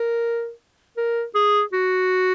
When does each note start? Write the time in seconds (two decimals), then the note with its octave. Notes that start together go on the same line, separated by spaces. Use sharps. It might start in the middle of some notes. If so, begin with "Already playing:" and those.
Already playing: A#4
0.97 A#4
1.35 G#4
1.73 F#4